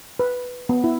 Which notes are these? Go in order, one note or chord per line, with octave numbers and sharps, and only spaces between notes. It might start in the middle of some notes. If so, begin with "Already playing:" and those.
B4
B3
E4